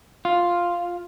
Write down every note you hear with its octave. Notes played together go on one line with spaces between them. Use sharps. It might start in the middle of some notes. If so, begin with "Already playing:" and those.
F4